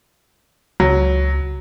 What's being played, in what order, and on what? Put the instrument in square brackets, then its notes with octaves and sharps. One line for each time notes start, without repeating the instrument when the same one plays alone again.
[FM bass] C#2 [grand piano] F#3